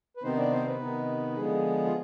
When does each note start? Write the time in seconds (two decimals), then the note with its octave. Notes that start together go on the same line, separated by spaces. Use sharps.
0.17 B4
0.23 C3 D#3 B3 C4 D#4 C5
0.37 D4 D5
0.51 C4 C5
0.66 B3 B4
0.80 C3 D#3 B3 D#4
1.36 D3 F3 G#3 B3 G#4
1.85 F4